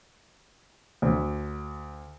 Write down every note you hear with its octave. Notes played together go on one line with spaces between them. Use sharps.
D2